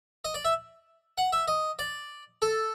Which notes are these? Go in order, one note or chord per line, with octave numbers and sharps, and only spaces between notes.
D#5
D5
E5
F#5
E5
D#5
D5
A4